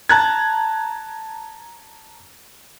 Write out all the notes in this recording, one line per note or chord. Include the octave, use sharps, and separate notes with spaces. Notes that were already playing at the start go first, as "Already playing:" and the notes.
A5 A#5 F#6 G#6